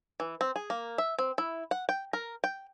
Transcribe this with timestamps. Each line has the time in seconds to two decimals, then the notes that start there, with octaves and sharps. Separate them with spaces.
0.20 E3
0.41 C4
0.56 G#4
0.70 A#3
0.98 E5
1.18 C4
1.38 E4
1.71 F#5
1.89 G5
2.13 A#4
2.44 G5